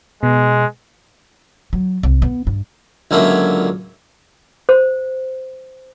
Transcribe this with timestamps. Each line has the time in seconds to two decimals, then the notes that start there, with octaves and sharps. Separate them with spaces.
0.23 B2 G#3
1.73 F#3
2.03 C2
2.22 B3
2.47 G2
3.11 C#2 D3 F#3 A#3 E5
4.69 C5